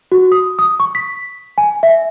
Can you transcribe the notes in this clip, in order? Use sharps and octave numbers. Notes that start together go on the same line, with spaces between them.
F#4
D#6
D#6
C#6
B6
G#5
E5